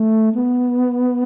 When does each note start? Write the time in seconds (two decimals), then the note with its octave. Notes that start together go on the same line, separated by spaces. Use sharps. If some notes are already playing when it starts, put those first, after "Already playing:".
Already playing: A3
0.34 B3